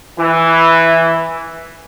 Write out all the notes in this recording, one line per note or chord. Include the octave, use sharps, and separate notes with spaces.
E3